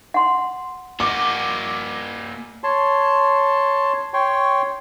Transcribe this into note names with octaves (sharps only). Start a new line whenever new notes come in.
F#5 C6
A#3 F#4 D6
C#5 A5 C6
C#5 G5 C6 C#6